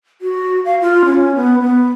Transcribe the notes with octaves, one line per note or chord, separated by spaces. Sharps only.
F#4
F5
F4
C#4
B3
B3